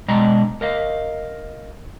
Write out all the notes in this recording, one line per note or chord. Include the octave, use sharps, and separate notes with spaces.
B2 G#3 D4 D#5 G5 A#5
A#4 D#5 F5